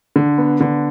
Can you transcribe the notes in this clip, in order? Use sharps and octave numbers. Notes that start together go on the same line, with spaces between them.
D3
B3
D3